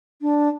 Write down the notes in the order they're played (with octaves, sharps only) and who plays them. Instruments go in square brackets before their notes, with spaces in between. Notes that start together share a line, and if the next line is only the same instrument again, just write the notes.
[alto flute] D4